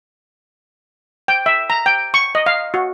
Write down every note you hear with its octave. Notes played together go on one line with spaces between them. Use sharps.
G5
E5
A#5
G5
C#6
D#5
F5
F#4